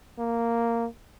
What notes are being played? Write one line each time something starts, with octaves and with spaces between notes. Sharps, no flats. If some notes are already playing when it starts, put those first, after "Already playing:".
A#3